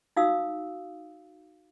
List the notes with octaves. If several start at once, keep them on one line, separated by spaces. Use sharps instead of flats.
D#4 F#4 F5 D#6 E6